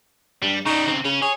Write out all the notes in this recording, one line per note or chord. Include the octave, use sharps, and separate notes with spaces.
G2 G3
C#3 G3 D#4
C#3 C4
C#3 C#4
G#4 C#5